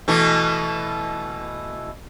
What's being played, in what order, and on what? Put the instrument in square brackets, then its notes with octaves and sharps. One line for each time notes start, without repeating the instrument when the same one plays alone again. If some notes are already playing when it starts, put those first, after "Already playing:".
[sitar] B2 E3 A3